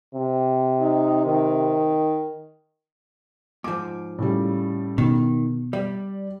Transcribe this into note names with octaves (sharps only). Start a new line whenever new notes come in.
C3
D#4
D#3
G#2 F3 D6
A2 C#3 G3
B2 D#3
G3 D5